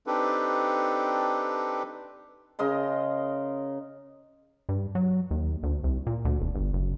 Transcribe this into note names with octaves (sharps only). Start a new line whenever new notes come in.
C4 D4 D#4 G4 A4 B4
C#3 A#4 D#5 C6
G2
F#3
D#2
D2
C2
A#2
D2
E1
G1
F#1